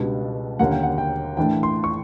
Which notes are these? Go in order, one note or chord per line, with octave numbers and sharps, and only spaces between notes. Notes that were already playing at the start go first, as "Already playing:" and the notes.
Already playing: C#2 B2 G3 B3 D4
D#2 D3 G3 A#3 C#4 F#5
G5
F#5
G5
A2 E3 A3 D4 G5
C6
C#6